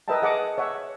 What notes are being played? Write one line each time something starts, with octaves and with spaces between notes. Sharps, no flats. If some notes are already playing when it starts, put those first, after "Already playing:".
A#4 B4 D#5 E5 G5 A5
G#4 D#5 F#5 A5 D6
C#5 E5 F#5